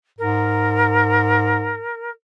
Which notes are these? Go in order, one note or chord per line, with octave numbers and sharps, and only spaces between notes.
G#2 A#4